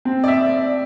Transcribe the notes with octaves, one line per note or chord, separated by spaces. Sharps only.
C4
D5
E5